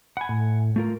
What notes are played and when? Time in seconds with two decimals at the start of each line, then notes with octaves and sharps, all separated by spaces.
0.17 F#5 G#5 B5
0.29 A2
0.76 A3 F4 A#4